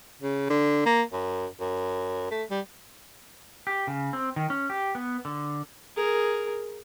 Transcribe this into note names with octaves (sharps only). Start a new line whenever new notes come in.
C#3
D3
A#3
F#2
F#2
A3
G3
G4
C#3
C4
D#3
C#4
G4
B3
D3
G#4 A#4